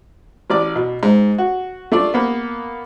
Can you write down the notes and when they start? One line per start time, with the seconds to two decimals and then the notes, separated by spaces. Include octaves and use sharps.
0.50 A1 D5 D6
0.76 B2
1.03 G#2
1.38 F#4
1.92 A3 D4 F4 D5
2.14 A#3 B3